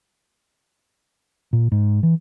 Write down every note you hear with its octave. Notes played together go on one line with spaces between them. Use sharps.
A#2
G#2
E3